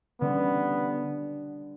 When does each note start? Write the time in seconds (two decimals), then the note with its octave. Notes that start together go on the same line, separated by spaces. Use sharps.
0.21 D3 G3 B3 D4